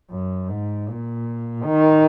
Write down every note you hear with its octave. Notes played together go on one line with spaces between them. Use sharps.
F#2
G#2
A#2
D#3